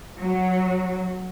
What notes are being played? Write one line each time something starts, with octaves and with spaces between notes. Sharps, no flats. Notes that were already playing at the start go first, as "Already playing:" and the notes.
F#3